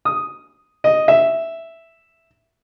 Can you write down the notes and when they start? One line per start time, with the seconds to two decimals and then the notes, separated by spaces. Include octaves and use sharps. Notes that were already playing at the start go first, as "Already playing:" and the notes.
0.05 D#6
0.84 D#5
1.08 E5